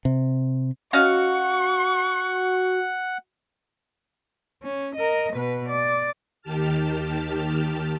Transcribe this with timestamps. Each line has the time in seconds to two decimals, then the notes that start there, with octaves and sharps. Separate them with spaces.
0.05 C3
0.93 C#4 F#4 D#5 F5 F#5 C#6
4.63 C#4
4.96 A#4 D#5
5.33 B2 B4
5.69 D5
6.41 D#2 D#3 G4 A5 F6